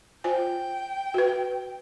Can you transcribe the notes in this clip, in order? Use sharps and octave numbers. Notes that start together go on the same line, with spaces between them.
F4 C5 G5 G#5
F#4 B4